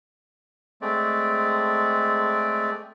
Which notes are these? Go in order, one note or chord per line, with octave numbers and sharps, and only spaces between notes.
G#3 A3 C4 D5